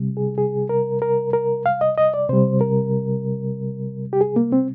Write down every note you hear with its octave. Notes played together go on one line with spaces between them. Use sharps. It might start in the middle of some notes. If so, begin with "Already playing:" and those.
Already playing: C3 G3
G#4
G#4
A#4
A#4
A#4
F5
D#5
D#5
D5
C3 G3 C5
A#4
G4
G#4
A#3
C4